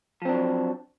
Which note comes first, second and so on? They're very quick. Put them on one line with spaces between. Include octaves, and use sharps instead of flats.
F3 C4 D4 F#3